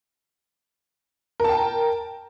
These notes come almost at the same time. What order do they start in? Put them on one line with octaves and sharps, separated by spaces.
A#4 A5 G5